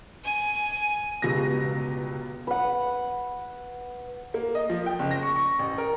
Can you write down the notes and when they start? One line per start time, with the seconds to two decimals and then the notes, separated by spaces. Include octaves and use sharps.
0.24 G#5
1.22 G1 C#2 B2 F4 G4 A#6
2.47 B4 F#5
4.34 A#3
4.55 D#5
4.69 F3
4.86 G5
4.99 F#1
5.11 A#6
5.23 C#6
5.36 C#6
5.59 A1
5.78 A#4